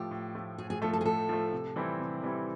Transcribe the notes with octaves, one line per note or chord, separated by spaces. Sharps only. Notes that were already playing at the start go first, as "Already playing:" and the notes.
Already playing: A2 F3 A3 G4
A2
F3 A3
A2 G#4
G#4
F3 A3 A4
A4
G#4
A2 A4
F3 A3
C3
E3 G3 C4 E4
C3
E3 G3 C4 E4